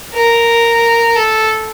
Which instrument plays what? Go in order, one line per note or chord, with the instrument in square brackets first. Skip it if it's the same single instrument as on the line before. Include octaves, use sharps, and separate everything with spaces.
[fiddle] A#4
A4